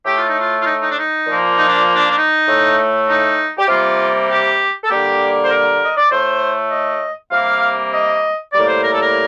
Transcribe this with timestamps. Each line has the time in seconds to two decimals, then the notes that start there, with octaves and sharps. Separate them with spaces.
0.05 A2 A3 G4
0.17 F4
0.28 D#4
0.40 F4
0.60 F4
0.65 D#4
0.81 D#4
0.90 D4
0.96 D#4
1.27 A#2 F3 A#3
1.57 D#4
1.69 D4
1.95 D4
2.11 D4
2.18 D#4
2.47 A2 A3
3.08 D#4
3.58 G4
3.68 C3 G3 A#3 F4
4.30 G4
4.84 A4
4.90 D3 G3 A#3 G4
5.45 C5
5.50 A#4
5.84 D#5
5.97 D5
6.11 A2 A3 C5
6.71 D#5
7.32 C3 G3 A#3 F5
7.93 D#5
8.53 A2 G3 A#3 D5
8.68 C5
8.84 A#4
8.93 A4
9.02 A#4